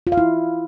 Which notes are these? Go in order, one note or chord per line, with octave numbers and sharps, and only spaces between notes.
F4
F5
E4